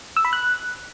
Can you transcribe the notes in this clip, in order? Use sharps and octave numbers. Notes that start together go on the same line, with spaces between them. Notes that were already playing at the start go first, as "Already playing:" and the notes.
E6
B5
F#6